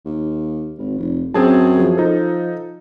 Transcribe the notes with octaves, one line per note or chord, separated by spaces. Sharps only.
D#2
G#1
F1
F#2 C4 G#4 A5
F3 G#4
F3 D#4 A4